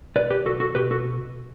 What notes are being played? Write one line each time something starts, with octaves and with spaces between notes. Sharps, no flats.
B1 B4 D5
G4 B4
B1 F#4 A4
F#4 A4
B2 G4 B4
F#4 A4